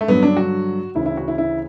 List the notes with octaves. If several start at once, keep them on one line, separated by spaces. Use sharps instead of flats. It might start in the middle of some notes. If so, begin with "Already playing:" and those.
A3
G2 D3 F#3 B3
D4
F#4
D2 C#3 E3 E4
E4
F#4
E4
E4